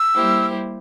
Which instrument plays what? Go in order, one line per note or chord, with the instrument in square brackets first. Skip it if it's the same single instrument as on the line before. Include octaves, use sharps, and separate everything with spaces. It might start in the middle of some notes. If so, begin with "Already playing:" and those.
Already playing: [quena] E6
[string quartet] G3 A#3 E4 G4 C5